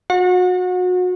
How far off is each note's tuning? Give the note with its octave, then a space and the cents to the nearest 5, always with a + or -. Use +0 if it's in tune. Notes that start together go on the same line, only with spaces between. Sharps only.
F#4 -30